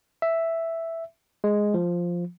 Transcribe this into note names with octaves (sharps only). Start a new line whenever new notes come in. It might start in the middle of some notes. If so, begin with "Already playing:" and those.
E5
G#3
F3